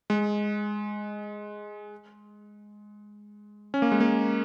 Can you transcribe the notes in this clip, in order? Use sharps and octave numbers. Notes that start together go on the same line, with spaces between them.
G#3
C#4
A#3
G#3
A#3